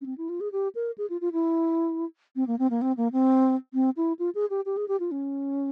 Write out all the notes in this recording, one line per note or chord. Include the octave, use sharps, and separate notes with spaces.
C#4
C4
E4
F4
G#4
G4
A#4
G#4
F4
F4
E4
C4
A#3
C4
A#3
C4
A#3
C4
C4
E4
F4
G#4
G4
G4
G#4
G4
F4
C#4